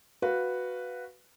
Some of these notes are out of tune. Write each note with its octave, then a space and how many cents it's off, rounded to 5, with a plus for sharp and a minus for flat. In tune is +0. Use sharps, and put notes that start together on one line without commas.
F#4 -5 B4 +0 F5 +0